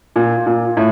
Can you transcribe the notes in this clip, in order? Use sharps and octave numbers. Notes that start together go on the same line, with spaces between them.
A#2
A#2
A2